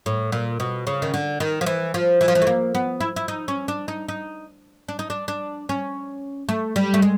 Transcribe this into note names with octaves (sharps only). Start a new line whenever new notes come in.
A2
A#2
B2
C#3
D#3
D3
D#3
F3
E3
F3
E3
F3
E3
A3
A#3
B3
E4
E4
D#4
C#4
D4
D#4
D#4
D4
D#4
D4
D4
C#4
A3
G3
A3
G#3